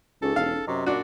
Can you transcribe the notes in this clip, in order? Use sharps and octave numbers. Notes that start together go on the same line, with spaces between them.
C#2 C#4 D#4 G#4 A4
E1 F5
F#2 C3 D#5 A#5 C#6
A#2 D4 F#4